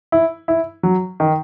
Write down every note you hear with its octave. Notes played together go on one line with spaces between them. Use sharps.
E4
E4
F#3
D#3